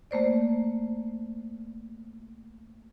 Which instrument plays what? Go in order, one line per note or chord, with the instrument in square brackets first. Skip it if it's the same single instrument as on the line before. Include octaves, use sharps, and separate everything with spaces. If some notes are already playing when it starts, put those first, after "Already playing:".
[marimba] A3 A#3 C5 D5